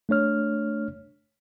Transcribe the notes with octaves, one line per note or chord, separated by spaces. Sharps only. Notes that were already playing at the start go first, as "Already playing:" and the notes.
A3 D4 C#5 F6